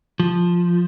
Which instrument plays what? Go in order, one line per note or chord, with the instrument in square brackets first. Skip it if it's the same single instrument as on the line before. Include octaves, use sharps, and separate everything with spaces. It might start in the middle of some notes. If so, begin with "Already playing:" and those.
[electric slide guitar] F3